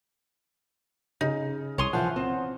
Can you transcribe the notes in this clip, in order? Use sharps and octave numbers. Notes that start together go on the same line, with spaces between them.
C#3 D#4
C2 C#5 C6 D#6
E3 F3 F#5
C4